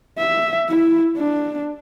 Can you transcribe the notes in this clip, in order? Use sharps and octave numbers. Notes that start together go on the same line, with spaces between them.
E5
E4
D4